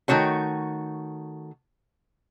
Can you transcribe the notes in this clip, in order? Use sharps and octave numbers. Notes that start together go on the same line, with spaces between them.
D#3 A3 F#4 C#5 G5